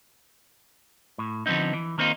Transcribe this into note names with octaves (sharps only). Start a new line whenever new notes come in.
A2
D3 F3 G#3 B3 C4 D#4
E3
D#3 A#3 C4 D#4 F4